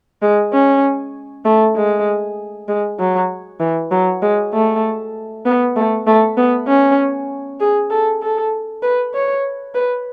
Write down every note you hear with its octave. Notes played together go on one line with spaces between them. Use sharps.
G#3
C#4
A3
G#3
G#3
F#3
E3
F#3
G#3
A3
B3
A3
A3
B3
C#4
G#4
A4
A4
B4
C#5
B4